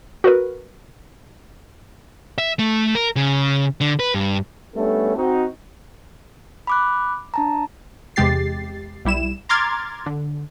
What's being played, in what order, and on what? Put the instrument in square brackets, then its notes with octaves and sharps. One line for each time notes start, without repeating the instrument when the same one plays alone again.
[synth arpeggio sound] F#4 A#4 B4
[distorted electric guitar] E5
A3
A#4
C#3
D3
B4
G2
[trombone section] G3 A3 B3 C#4 D4 A4
C4 D#4 F#4
[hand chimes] B5 D6 F#6
D4 A5 A#5
[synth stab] E2 C3 G#3 G4 A6 C7
B1 G3 E4 E7
A#5 C6 D6 F6 G#6 A6
D3